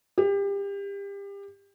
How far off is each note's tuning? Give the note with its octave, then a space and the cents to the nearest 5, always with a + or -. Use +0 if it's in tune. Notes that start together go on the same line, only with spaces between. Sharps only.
G4 +30